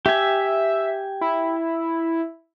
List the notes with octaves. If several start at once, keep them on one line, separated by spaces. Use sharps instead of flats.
G4 E5 G#5
E4